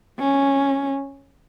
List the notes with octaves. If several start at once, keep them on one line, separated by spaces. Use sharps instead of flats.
C#4